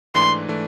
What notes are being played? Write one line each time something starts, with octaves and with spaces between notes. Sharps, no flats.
G#2 E3 A3 D4 C6
E3 A3 D4